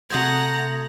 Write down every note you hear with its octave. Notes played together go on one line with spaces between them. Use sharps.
C3 A3 F#4 C5 F#5 A#5 D#6 G#6